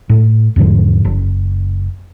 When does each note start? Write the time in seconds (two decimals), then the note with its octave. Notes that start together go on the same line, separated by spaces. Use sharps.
0.10 A2
0.56 E2 G#2 D3 F3
1.05 F#1